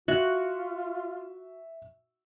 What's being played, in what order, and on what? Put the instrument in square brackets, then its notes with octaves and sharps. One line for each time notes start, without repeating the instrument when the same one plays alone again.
[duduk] F4 [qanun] F#4 [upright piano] E5